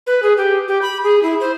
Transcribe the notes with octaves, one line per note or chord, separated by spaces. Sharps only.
B4
G#4
G4
G4
B5
G#4
E4
C5